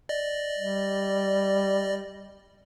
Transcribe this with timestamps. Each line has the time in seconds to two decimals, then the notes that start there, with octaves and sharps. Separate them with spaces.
0.09 D5 D#5
0.58 G3